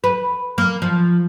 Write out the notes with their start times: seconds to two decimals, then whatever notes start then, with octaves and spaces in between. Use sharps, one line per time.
0.04 B4
0.58 A#3
0.82 F3